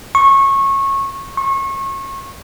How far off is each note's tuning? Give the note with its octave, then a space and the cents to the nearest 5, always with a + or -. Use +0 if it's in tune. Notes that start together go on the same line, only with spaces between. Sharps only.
C#6 -20
C#6 -30